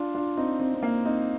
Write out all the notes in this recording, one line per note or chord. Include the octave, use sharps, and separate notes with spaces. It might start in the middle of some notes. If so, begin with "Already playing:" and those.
Already playing: D4 F4
D4 F4
C4 D#4
C4
C4
A#3
C4 D#4